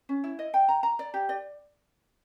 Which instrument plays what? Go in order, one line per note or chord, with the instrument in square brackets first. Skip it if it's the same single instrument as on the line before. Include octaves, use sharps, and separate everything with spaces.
[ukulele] C#4
E4
D#5
G5
A#5
A#5
D5
G4
D5